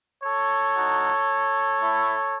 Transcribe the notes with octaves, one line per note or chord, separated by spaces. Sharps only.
A4 C#5
A3 D#4 F#4
A3 E4